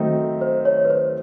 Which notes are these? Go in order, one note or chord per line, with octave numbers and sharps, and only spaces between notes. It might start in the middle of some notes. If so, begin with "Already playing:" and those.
Already playing: D#3 F#3 A3 C4 D#4
C5
C#5
B4
C5